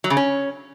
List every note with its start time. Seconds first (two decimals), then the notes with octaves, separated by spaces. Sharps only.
0.04 F#3
0.10 C#3
0.17 C#4